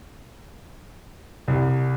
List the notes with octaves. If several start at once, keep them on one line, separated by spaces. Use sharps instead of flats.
C2